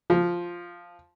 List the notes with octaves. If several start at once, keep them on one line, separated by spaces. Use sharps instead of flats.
F3